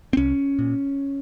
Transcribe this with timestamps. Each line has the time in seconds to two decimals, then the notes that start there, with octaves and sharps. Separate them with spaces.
0.13 C4
0.17 C2 C#4
0.59 A#2